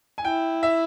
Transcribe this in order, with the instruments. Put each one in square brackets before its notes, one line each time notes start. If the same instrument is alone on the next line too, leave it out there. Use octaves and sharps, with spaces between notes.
[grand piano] G#5
[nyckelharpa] E4 [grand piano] G5
[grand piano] E5